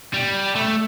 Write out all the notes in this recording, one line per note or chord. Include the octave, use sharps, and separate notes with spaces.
G3
A3